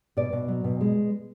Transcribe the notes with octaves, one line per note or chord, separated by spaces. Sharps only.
B2 D5
B2
F#3
B2
G#3